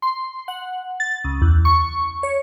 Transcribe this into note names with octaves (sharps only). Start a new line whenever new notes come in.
C6
F#5
A6
C#2
E2
C#6
C#5